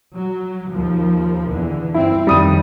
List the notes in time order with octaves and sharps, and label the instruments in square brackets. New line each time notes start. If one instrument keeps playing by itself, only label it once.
[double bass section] F#3
D#2 F3
E2 D3 E3
[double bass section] G2 C4 [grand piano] E4
[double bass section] F2 D#3 [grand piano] G3 D#6 D#7